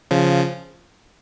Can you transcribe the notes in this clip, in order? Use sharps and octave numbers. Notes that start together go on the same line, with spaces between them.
C#3 F3